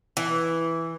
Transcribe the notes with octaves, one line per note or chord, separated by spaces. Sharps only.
E3